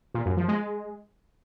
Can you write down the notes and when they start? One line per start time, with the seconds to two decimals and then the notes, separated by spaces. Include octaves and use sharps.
0.14 A#2
0.26 F#2
0.37 F3
0.48 G#3